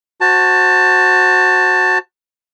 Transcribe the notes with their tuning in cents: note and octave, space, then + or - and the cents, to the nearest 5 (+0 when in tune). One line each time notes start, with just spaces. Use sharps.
F#4 +0 C5 +10 A5 +15